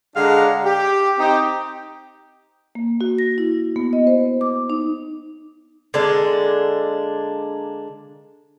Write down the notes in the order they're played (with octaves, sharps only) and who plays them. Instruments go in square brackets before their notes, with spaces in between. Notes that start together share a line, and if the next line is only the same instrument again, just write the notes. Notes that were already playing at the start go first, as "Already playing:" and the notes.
[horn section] D3 G#3 D4 F5 F#5 A#5
G4
C4 D#4 G4
[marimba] A#3
F#4
A#6
E4
B3
D#5
C5
D6
D#4
[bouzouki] D3 G#3 A#3 D4